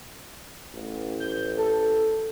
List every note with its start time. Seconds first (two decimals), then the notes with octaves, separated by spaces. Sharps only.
0.75 A1
1.20 G6
1.58 A4